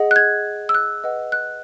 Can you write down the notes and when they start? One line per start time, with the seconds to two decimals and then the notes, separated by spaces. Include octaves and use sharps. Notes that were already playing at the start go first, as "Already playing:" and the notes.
Already playing: G#4 D#5 F#5
0.11 F#6
0.16 G#6
0.69 E6
0.74 F#6
1.04 B4 D#5 F#5
1.32 F#6